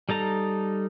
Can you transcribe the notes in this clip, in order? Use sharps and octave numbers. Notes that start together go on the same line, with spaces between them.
G3 D#4 A4 A#5